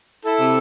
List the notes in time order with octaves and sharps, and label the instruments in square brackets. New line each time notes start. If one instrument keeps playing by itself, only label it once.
[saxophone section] E4 A4
C3